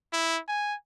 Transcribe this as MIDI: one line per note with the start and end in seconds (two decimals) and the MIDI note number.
0.13 0.39 64
0.48 0.74 80